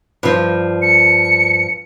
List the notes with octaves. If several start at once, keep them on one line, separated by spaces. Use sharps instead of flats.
G2 F3
C#7